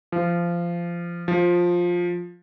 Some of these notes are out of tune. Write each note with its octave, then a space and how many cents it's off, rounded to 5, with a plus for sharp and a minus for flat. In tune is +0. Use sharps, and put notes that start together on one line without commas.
F3 -20
F3 +10